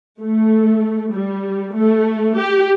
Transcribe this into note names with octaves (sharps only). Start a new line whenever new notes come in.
A3
G3
A3
G4